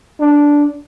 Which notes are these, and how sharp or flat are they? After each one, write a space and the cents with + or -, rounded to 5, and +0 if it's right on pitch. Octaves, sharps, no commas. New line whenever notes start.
D4 -10